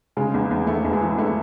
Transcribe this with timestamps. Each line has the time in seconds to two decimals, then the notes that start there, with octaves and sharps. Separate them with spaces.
0.17 C#3 G#3
0.34 E2
0.51 E2
0.67 E2 A3
0.85 E2
0.93 G#3
1.01 E3
1.18 E2 A3